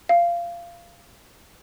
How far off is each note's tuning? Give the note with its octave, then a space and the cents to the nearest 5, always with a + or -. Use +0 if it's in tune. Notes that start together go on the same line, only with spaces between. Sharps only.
F5 -20